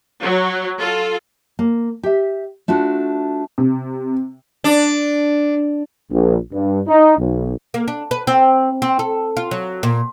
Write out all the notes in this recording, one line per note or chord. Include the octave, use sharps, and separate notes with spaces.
F#3
F4 A4
A#3
G4 E5
A3 D4 F4 F#4
C3
D4
A#1
G2
D#4
B1
A#3
D4
B4
C4
C4
A4
F4
F#3
A#2